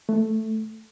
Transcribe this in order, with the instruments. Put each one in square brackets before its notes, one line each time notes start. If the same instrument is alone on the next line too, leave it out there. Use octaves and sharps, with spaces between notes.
[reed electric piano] A3